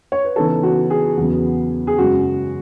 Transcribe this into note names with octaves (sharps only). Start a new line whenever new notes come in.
C#5
B4
C#3 E3 B3 D#4 A4
F#4
G#4
E2 C#3 F#3 B3
G#4
F#2 C#3 G#3 F#4